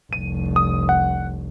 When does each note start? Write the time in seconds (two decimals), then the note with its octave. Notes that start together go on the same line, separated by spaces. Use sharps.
0.13 F1 C2 D#7
0.56 D#6
0.89 F#5